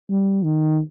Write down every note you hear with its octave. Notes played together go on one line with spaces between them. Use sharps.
G3
D#3